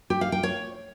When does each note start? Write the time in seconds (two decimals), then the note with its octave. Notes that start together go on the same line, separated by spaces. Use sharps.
0.10 G4
0.21 F5
0.32 G5
0.43 C#5